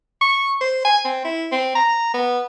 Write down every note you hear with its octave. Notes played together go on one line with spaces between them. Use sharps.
C#6
C5
G#5
C4
E4
C4
A#5
B3